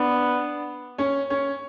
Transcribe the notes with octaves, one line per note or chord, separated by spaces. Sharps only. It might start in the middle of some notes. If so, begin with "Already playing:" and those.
Already playing: B3 D4 D5
C#4 C#5
C#4 C#5